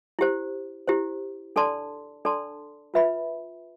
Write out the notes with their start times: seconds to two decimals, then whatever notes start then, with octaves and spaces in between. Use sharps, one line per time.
0.19 E4 G4 C5
0.88 E4 G4 C5
1.56 D4 A4 D5 A5 C6
2.25 D4 A4 D5 A5 C6
2.94 F4 B4 E5 B5